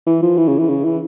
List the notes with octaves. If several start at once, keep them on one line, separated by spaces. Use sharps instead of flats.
E3
F3
E3
C#3
E3
C#3
E3